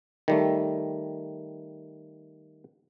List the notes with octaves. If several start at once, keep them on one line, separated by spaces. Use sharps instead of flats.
D#3 G3 A3